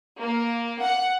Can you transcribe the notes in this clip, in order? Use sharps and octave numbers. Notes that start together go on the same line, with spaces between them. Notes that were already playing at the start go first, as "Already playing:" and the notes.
A#3
F#5